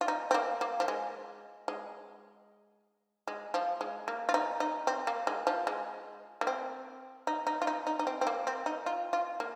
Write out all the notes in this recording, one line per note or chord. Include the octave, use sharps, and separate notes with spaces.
F4
D#4
C4
A#3
A#3
F3
G#3
G#3
G#3
F3
G#3
A#3
F4
D#4
D#4
C4
A#3
G#3
F3
G#3
A#3
C4
D#4
D#4
F4
D#4
D#4
D#4
C4
C4
A#3
C4
D#4
F4
F4
A#3